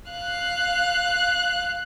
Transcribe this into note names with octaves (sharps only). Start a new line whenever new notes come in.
F5 F#6